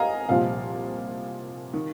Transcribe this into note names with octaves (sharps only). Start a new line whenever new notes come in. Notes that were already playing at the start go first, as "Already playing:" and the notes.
Already playing: D#5 F5 G#5 A#5
C2 A#2 F3 F5
D#3